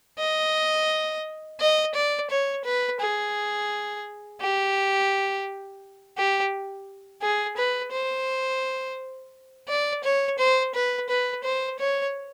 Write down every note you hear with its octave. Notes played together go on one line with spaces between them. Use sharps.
D#5
D#5
D5
C#5
B4
G#4
G4
G4
G#4
B4
C5
D5
C#5
C5
B4
B4
C5
C#5